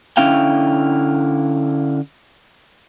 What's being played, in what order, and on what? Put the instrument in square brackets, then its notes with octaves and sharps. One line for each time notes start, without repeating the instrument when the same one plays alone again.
[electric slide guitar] D3 C#4 E4 F5 G5